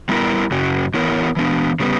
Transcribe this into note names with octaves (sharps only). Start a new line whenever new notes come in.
G3 B3 E4 A#4
F#2 C#3 F#3
E3 B3 E4 A#4 C#5
E3 B3 D4
C#3 G3 B3